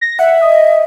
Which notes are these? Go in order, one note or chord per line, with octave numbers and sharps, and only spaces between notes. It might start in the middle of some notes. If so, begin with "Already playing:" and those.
A#6
E5 F#5
D#5